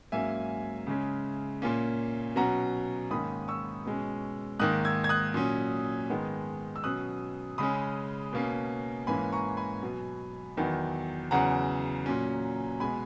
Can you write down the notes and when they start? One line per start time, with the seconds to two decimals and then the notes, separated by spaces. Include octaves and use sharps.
0.12 G#2 F#3 A#3 C#4 E5 G#5
0.87 C#3 G#3 C#4
1.62 A#2 A#3 C#4
2.36 B2 F#3 C#4 F#5 A#5
3.11 G#2 D#3 A#3 C#4 B5 D#6
3.48 C#6 E6
3.86 B2 G#3 C#4
4.60 G#2 D#3 A#3 D#6 F#6
4.85 E6 G#6
5.04 G#6
5.09 D#6 F#6
5.34 A#2 F#3 C#4
6.10 G#2 D#3 G#3 B3
6.76 E6
6.84 B2 F#3 C#4 D#6 F#6
7.58 C#3 G#3 C#4 B5 D#6
8.33 B2 A#3 C#4
9.07 G#2 E3 A#3 C#4 G#5 B5
9.33 A#5 C#6
9.57 G#5 B5
9.83 B2 F#3 B3
10.57 E2 D#3 F#3 B3
11.31 E2 C#3 F#3 F#5 A#5
12.06 A#2 F#3 C#4
12.80 B2 G#3 B3 G#5 B5